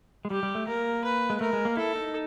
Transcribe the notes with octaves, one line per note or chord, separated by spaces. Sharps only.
G#3
G3 G4
G3
A3
A#3 A#4
B4
G#3
A3 A#4
G#3
A#3
E4 A4
D#4